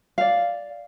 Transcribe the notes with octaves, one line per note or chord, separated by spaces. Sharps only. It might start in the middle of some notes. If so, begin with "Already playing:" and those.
D5 F5